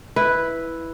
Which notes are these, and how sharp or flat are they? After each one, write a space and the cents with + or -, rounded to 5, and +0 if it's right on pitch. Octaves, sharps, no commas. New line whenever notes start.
E4 +0 B4 +0